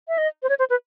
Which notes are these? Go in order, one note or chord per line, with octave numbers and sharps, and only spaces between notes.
E5
D#5
C5
C#5
C5
B4